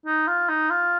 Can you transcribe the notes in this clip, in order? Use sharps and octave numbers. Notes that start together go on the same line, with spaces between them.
D#4
F4
D#4
F4